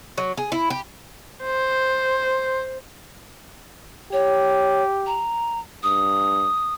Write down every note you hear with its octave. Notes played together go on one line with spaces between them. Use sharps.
F#3
G#4
E4
G4
C5
G4 C#5
A#5
G2 D#6